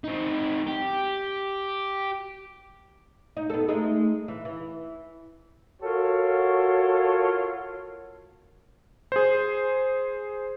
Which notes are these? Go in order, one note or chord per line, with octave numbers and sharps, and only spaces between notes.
C4 D#4
G4
D#4
B3 A4
G#3 A3 D#4
E3
E3
F4 F#4 A4 A#4 C#5
G#4 C5